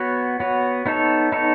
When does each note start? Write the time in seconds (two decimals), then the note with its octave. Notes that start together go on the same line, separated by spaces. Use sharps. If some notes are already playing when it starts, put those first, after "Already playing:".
Already playing: B3 F#4 C#5
0.40 B3 F#4 C#5
0.86 B3 D#4 A4 C#5
1.32 B3 D#4 A4 C#5